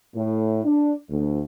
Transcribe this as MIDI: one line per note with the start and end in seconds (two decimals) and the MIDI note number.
0.15 0.60 45
0.64 0.95 62
1.10 1.42 38